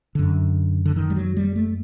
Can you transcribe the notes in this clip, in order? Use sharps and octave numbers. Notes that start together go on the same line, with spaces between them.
F#2 D3
D3
D#3
G3
F#3
G3
A3